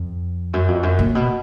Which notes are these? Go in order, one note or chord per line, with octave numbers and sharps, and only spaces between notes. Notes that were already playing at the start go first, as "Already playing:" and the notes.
Already playing: F2
F#2
F2
F#2
A#2
B2